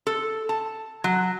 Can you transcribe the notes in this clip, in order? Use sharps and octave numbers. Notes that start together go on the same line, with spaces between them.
A4
A5
F#3